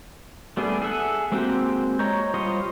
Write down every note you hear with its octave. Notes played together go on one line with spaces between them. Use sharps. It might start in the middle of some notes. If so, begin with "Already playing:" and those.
G3 A3 B3 D4 G#4
G#4 A4 E5 F#5
G#3 A#3 C4 F#4 G4
C#5 D#5 A#5 C#6 G6
G3 F4 C5 C#5 D#5